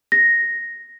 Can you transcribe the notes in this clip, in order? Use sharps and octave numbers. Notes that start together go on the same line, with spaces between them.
A#6